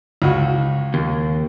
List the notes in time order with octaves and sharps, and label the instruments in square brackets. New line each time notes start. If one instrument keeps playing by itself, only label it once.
[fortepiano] C#2 F#4
[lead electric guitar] D#2